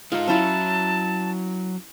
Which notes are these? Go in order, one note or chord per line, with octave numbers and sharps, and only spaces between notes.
G#3 D#4 F4 A4
F#3 C#4 E4 A5